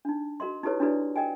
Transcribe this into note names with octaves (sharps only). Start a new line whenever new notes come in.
D4 D#4
F#4 A#4 D#5 C6
D#4 E4 G4 A4 B4 C#5
D4 E4 F#4 A4 B4 D5
A#4 D#5 G5 G#5